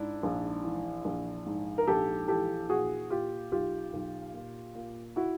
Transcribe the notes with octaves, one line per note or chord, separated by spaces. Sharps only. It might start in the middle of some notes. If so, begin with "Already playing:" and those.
Already playing: G#2 D4 E4
A#1
E3
A#1
G#2
A#4
A#1 G4 A4
E3 G4 A4
A#2 F#4 G#4
A#2 F4 G4
B1 F4 G4
B1
A#2
A#2
E4 F#4